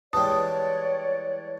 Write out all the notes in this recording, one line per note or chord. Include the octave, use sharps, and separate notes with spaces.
E3 G3 G#3 C#5 D5 G5 A5 D#6